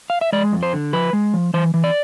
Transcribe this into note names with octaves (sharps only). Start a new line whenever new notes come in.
F5
E5
G#3 D5
F2
C5
D3
F3 B4
G#3
F3
E3 C5
E3
D5